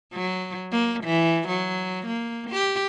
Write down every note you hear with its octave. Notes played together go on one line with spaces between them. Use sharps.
F#3
A#3
E3
F#3
A#3
G4